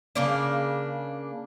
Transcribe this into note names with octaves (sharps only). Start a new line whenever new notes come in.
C#3 A#3 D4